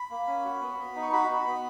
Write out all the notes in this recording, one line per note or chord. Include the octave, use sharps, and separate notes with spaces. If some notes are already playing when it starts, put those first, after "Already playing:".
Already playing: B5
A#3
C#4
F#4
B3
B3
D#4
C#6
F#4 B5
B3
B3